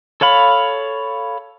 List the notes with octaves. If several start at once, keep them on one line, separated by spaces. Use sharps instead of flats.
A4 C#5 F5 B5